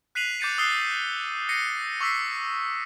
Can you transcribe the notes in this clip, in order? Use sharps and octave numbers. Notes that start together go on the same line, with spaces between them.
F#6 B6 C7 D#7 F7 F#7
D6 G6 A6 C#7 D#7
D#6 E6 F#6 A6 C7 G7
A#6 C7 C#7 D#7
C#6 D6 E6 B6 C7